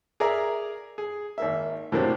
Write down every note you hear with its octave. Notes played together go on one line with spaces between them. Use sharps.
G#4 A#4 D5 E5 A#5
G#4
G#1 A#3 E5
A2 C3 F#3 A#3 C4 D4